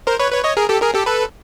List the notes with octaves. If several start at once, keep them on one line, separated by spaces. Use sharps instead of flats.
A#4 C5
B4 C#5
B4 C#5
C#5 D#5
G#4 A#4
G4 A4
G#4 A#4
G4 A4
A4 B4